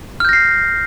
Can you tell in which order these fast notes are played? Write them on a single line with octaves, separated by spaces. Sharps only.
F6 G6 A#6 C7